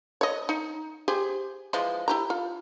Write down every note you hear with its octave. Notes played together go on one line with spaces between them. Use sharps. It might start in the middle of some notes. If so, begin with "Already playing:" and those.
C#5 D#5
D#4
G4 G#4 C5
E3 F3 G#3
E4 G4 A#5
F4